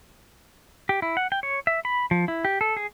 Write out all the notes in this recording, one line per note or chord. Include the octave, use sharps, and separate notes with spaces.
G4
E4
F#5
G5
C#5
E5
B5
F3
E4
G4
A4
G#4